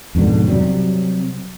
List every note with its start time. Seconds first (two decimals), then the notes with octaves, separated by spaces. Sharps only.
0.15 F2 G#2 B2 D3
0.48 C3 F#3 G3